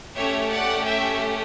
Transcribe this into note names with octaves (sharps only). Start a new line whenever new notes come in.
A3 C#4 G4 C#5 E5
D5 F#5
E5 G5